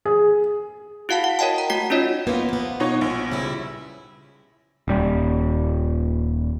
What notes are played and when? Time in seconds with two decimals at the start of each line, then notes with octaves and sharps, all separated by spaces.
0.05 G#4
1.09 E4 F#4 F5 F#5 A5
1.24 F#5
1.39 A#4 C#5 D#5 G5 A5
1.58 A#5
1.70 A3 F#4 F#5 B6
1.90 C#4 D#4 F4 C#5 D#5
2.27 A#3 B3 E4 F4
2.49 F3 B3
2.80 B2 D#4 C#5
3.01 A#1
3.32 C#3 G3 E4
4.88 D#1 G3